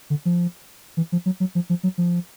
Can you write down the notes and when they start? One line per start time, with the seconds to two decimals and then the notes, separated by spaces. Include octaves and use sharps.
0.10 D3
0.25 F3
0.97 E3
1.12 F3
1.26 F#3
1.40 F#3
1.55 F3
1.70 F3
1.83 F#3
1.98 F3